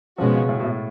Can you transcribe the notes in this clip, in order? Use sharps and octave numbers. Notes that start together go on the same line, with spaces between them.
B2 F3 G#3 C#4 F#4
C#3
A2
B2
A2